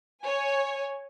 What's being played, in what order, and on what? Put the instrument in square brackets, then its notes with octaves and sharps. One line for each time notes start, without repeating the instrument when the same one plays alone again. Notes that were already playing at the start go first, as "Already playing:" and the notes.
[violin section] C#5 G#5